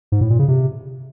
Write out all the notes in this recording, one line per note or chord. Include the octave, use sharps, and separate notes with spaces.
G#2
A2
A#2
C#3
C3